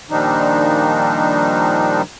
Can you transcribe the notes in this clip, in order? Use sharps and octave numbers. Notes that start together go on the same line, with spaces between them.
A#2 D#3 F3 G3 D4 D#4